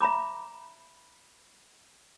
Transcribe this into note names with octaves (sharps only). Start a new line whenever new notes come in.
E5 A#5 B5 D6